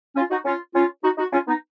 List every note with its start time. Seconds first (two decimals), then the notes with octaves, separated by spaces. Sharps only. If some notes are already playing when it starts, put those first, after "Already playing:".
0.16 C#4 F4
0.31 D#4 F#4
0.45 C#4 F4
0.75 C#4 F4
1.03 D#4 F#4
1.18 D#4 F#4
1.33 C#4 F4
1.47 B3 D#4